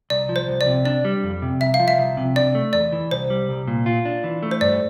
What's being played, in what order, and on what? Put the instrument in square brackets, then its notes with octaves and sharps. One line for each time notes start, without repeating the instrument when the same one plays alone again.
[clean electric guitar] C2 [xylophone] D5
[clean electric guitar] F3
[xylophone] C5
[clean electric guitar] C2
[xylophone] D5
[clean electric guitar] C3
[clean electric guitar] D4 [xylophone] D5
[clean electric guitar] G3
F2
C3
[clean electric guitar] C2 [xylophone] E5
[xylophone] F5
[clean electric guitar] F3
[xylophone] E5
[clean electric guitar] C2
C3
[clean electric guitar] D4 [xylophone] D5
[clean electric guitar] A3
[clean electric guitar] E2 [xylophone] D5
[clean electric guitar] E3
[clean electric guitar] C2 [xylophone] C5
[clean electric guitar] G3
C2
A#2
F4
D4
E3
A3
[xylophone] C5
[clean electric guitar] G2 [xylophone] D5